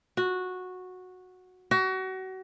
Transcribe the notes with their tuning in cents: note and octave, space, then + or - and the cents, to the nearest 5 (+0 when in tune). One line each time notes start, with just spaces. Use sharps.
F#4 -10
F#4 +30